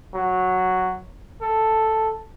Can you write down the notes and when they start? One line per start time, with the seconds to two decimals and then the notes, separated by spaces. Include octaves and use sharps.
0.14 F#3
1.42 A4